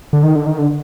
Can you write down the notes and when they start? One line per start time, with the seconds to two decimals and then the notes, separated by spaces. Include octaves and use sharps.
0.13 D3
0.23 D#3
0.36 D3
0.47 D#3
0.59 D3